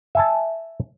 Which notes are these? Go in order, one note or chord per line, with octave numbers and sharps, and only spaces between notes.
E5 G#5 A5